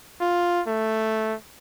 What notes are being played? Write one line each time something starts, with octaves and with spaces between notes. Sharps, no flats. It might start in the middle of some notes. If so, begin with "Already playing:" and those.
F4
A3